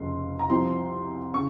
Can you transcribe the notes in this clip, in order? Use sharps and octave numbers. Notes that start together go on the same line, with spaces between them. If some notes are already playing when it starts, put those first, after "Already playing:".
Already playing: F1 F2 C#3 F3 A#3 C6
A#5
C2 C3 F3 C4 C6
C#3 C#6